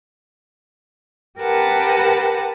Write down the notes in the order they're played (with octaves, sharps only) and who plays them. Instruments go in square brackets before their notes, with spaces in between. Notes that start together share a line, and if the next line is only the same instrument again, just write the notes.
[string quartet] G4 A#4 B4 F#5 A5